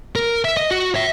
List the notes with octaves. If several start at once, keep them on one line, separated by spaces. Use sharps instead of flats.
A#4
E5
D#5
F#4
C#5 E5